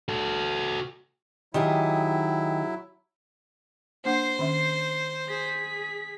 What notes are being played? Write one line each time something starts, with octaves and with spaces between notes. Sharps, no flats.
F#4 A4
D#3 F#3 E4 G4 G#4
A#3 D4 C5 F#5 C7
D#3 C#4 E5
G#4 B6